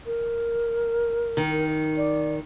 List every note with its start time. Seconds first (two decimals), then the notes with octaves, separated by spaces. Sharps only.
0.06 A#4
1.37 D#3
1.97 D5